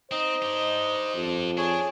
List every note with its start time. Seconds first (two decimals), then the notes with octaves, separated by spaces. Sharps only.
0.11 C4 D#4 C5 D#5
0.42 D4 G4
1.16 F2
1.58 D4 G#4 C#5 G#5